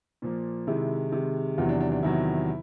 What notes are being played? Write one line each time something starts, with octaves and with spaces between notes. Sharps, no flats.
A#2 F3 A#3
C3 D#3 G#3 E4
C3 D#3 G#3
E2 C3 D#3 F#3 F4
D4
D4
D4
E2 C3 D#3 F#3 E4